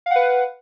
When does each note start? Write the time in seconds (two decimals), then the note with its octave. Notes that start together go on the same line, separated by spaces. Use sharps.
0.06 F5
0.11 F#5
0.16 B4